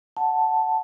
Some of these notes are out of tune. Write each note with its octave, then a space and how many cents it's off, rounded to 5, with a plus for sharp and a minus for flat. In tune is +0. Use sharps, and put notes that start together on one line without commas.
F#5 +0 A5 +0